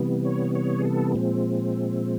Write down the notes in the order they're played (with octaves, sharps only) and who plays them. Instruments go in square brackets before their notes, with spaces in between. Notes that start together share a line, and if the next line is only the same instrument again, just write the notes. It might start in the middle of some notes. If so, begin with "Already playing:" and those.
Already playing: [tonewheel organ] C3 E3 G3 B3
C#5
C#5
G#4
A4
A#2 F3 G#3 C4